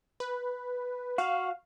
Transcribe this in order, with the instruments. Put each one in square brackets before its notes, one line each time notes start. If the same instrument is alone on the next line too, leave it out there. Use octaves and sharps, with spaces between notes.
[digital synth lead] B4
[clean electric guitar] F#4 [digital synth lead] F5